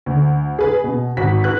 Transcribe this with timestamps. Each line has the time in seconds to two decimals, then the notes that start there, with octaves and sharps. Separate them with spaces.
0.06 D2
0.59 G#4 B4
0.84 B2
1.17 G#1 F#4 B6
1.44 F#4 B4 F#6